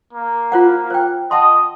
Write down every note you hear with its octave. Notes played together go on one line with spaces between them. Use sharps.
A#3
F4 C5 F#5
C5 G5
D#5 F#5 A5 C6